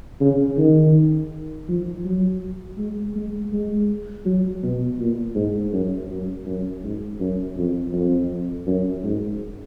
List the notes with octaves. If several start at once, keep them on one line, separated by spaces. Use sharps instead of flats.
C#3
D#3
F3
F#3
G#3
G#3
G#3
F#3
B2
A#2
G#2
F#2
F#2
F#2
G#2
F#2
F2
F2
F#2
G#2